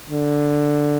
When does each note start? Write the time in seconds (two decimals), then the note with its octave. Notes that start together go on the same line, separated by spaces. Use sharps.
0.10 D3